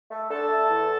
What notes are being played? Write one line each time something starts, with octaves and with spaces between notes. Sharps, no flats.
A3
D3 A4 A5
A3
E2